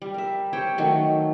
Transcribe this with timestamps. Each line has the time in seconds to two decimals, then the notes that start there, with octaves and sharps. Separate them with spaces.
0.02 G3
0.14 A#4 E5
0.53 G4 C5 C#5 G5
0.78 D#3 F#3 A3